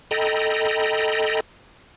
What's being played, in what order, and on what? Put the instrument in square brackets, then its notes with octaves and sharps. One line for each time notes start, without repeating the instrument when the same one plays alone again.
[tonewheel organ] A4 D#5 G5 A#5 B5